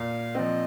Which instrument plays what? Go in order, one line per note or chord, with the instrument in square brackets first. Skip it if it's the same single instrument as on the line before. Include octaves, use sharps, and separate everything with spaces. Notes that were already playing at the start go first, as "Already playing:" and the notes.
Already playing: [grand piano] A#2 [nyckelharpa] F5
[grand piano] F3 C4 [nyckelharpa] D#5